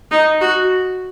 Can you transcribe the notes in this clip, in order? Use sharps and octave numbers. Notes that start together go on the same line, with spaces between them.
D#4
F#4